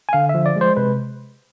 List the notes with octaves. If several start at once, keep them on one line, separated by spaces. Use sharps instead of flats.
G#5
D3 F5
E5
F3
D5
G#3
C5
C3 B4